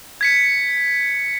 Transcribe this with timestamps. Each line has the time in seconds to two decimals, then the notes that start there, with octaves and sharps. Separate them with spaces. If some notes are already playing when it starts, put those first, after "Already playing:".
0.21 G#6 B6 C#7